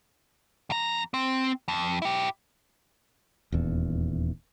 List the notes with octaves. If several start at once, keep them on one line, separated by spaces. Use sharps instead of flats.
F2 A#5
C4
F2
E4 G4
D#1 E2